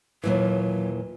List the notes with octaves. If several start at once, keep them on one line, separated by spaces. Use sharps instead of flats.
D#2 A#2 E3 F#3